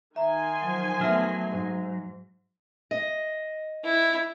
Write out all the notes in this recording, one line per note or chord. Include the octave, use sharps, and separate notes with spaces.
D#3 E5 G#5 A#5 C6
F3 F#3
F#3 A3 B3 E5 F6
G#2
D#5
E4